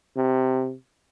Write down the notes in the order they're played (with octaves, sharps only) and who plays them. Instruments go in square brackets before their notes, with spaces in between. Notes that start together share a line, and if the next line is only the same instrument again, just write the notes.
[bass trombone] C3